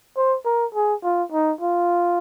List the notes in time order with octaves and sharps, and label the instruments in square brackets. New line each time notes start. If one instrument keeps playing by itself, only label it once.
[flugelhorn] C5
A#4
G#4
F4
D#4
F4